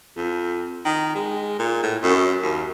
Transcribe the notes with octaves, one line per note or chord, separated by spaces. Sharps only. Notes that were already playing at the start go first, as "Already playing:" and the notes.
F2
D#3
G#3
A#2
A2
F#2
D#2